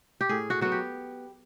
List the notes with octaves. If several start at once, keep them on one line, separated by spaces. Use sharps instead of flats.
G4
A2 G#4
F#4
F#3 B3 F#4
G4